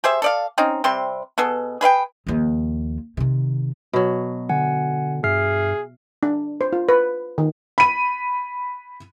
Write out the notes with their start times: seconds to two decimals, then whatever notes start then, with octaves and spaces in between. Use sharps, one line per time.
0.04 G4 G#4 C5 E5
0.22 A4 D5 F5
0.58 C4 C#4 D#4
0.84 C3 G3 C4 C6
1.38 B2 B3 G#4 A4
1.81 G#4 B4 F5 G5
2.27 D#2 F3
3.17 C3 D#3
3.93 B2 F#3
4.49 D3 F#5 G#5
5.24 G2 G#4 E5 F6 C7
6.23 D4
6.61 C5
6.73 F4
6.89 B4
7.38 D#3
7.78 B5 D#7